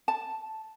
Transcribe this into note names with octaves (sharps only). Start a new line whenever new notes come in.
A5